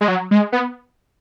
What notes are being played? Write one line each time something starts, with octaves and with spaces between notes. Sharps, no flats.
G#3
F#3
G#3
B3